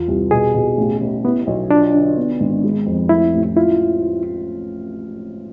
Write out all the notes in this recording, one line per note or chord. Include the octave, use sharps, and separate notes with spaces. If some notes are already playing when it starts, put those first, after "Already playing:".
Already playing: E2 F4
C2
B2 G#4
B2
A1
A1
B3 E4
B1
D4 F4
D3
B3
G#1
G#3
F2
A3 E4
A1
E4 F4